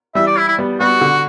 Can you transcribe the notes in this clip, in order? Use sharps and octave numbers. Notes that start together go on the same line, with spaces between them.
E3 G3 E5
D5
E4
E4
G3 B3
G3 B3 F#4
D3